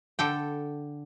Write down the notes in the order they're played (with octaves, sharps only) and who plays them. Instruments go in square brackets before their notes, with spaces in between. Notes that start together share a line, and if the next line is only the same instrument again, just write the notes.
[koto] D3 A4 G5